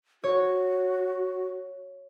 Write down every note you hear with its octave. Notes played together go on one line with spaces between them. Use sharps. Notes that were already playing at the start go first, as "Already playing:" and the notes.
F#4 C#5